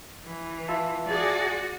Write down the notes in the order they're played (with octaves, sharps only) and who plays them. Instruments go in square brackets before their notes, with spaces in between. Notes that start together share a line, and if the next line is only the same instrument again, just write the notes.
[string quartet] E3
[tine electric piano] F4 E5 A5
[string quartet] F#4 [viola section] G#4 D5